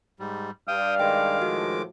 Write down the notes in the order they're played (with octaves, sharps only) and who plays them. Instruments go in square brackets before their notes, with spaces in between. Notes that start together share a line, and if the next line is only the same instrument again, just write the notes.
[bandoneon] G#2 G3
[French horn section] G2 D5 [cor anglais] F5 [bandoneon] G5 D#6
[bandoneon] D#3 G#3 D6 [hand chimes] G5
[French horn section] A2 F3 A4 [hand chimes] F#4